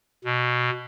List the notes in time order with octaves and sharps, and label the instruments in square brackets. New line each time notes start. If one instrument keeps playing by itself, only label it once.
[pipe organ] B2